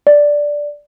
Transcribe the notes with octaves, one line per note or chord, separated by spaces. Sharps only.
D5